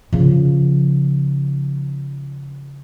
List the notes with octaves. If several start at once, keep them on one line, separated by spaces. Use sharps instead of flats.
C#3 F3